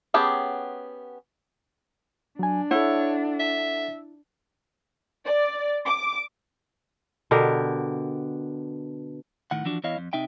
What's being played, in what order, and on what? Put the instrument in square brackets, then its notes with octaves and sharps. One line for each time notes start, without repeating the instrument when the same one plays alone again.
[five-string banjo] B3 C#4 G4 G#4 A5
[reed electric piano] F#3 G#5 [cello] D4
[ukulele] E4 [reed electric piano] A4 F#5 [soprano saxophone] C#5
[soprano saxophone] E5
[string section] D5
D6
[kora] B2 D3 G4 A#4
[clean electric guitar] A2 D#3 F#5
E3 F3 D4 F#4
E2 E4 C#5 D#5 F5
F2
C3 D#4 E5 G5